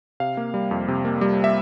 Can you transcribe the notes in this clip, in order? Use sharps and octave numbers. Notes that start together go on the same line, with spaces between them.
C3 F5
A#3
G3
F2
C3
A#3
G3
E5